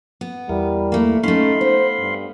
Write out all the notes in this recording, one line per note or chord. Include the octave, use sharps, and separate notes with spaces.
B3
E2 G3 E4 A#4
A3 A#3
A3 C#4 D#4 F5 B5 C6
B3 C5
G2